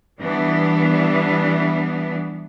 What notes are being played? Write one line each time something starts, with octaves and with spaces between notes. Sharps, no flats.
E3 G3 B3 D4